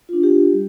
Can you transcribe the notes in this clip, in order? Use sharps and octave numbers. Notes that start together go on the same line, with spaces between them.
D4 F4
G4
G3